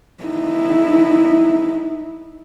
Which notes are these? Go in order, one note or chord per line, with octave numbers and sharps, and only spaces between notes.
D#4 E4